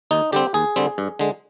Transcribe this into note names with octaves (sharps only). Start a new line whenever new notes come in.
D#2 D#4
D3 G3 C4 G4
D#2 G#4
D3 G3 C4
G2
D3 G#3